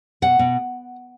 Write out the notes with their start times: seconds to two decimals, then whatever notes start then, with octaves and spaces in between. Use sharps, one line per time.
0.22 B2 F#5
0.39 B2